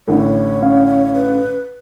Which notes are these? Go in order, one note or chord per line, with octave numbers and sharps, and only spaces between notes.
A1 A2 D3 C#5
C#4 F5
B4